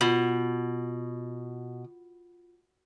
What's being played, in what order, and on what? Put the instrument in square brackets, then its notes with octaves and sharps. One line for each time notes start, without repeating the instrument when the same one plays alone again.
[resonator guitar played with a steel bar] B2 [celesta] F4 B5 F#7